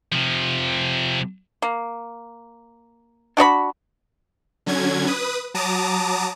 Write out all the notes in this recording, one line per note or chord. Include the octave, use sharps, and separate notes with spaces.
C3 F3
A#3
D4 F#4 D5 B5
D3 F#3 C#4 G#6
B4 D#6
F#3 A5 A#5 D6 D#6